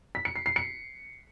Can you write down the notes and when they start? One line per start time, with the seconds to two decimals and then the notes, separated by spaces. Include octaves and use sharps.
0.15 B6
0.25 C#7
0.36 C7
0.46 C7
0.56 C#7